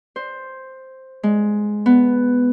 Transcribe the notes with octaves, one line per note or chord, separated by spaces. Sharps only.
C5
G#3
B3